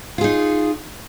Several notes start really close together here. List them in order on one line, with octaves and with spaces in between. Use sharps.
F4 G#4 D#4